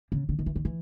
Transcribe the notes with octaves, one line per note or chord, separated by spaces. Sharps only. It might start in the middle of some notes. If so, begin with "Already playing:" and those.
C#3
D3
D#3
E3
D#3
E3